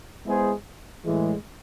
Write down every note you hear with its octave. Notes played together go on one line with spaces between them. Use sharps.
G#3 B3 E4 G#4 C5
A2 E3 G#3